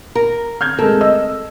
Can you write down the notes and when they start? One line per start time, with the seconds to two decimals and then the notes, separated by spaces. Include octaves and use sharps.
0.15 A#4
0.61 F6 G6 G#6
0.79 G#3 A3 A4 A#4
1.01 D#5 E6